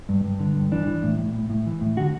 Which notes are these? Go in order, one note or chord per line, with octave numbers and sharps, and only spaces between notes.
G2
G2
D3
G2
E3 D4
E3
A2
A2
A2
A2
E3
A2
D3 F#4